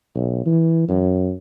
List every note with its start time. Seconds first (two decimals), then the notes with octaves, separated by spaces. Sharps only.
0.15 B1
0.46 E3
0.88 F#2